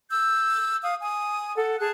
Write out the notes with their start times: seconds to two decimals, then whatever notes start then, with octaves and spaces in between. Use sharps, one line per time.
0.09 E6 G6
0.81 F5 D#6
1.00 G#5 D#6
1.55 A4 F#5
1.79 G#4 A5 F#6